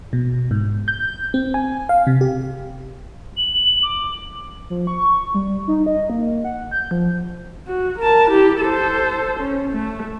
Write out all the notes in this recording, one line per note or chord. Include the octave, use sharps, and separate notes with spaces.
B2
G#2
G6
C4
G#5
F5
C3
G4
F#7
D6
F3
C#6
G3
D#4
D#5
A#3
F#5
G6
F3
F#4
A#4 A5
E4 G4
A4 C5
C#4
A3